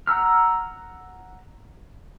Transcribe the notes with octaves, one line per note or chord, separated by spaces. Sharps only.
F#5 A#5 E6 F6